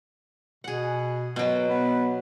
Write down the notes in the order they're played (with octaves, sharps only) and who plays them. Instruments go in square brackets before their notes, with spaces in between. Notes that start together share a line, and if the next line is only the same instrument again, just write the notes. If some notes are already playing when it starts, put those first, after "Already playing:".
[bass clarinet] B2 [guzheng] G#4 F#5
[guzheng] B2 F#3
[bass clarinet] B3